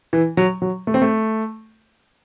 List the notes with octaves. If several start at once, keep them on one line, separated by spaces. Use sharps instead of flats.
E3
F#3
F#3
A3
C4
A3